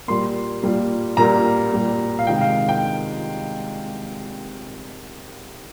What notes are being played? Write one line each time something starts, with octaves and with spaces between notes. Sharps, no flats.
A#2 G3 A#3 C6
A#2 G3 A#3
A#2 G3 A#3 A#5
A#2 G3 A#3
F5
C3 D#3 G#3 G5
F5
G5